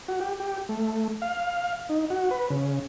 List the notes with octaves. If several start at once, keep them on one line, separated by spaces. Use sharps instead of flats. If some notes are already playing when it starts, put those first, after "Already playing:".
F#4
G4
G4
A3
F5
D#4
F#4
B4
C#3